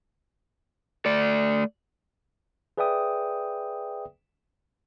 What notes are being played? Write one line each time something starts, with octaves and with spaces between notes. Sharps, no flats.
A3 D5
G#4 B4 D5 E5 G5 D#6